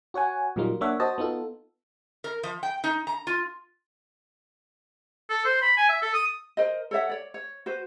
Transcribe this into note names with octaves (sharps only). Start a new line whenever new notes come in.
F#4 C#5 F#5 G#5
A#2 F#3 G3 A#3 D#4 F4
A#3 D4 C#5 E5 F#5
F#4 C5 D#5 A5
B3 D#4 F4 A4
A#4
F3
G5
D#4
A#5
F4
A4
C5
B5
G#5
E5
A4
D#6
A#4 C5 D#5
A4 C#5 E5 F#5
C#5 D5
C#5
F#4 B4 C5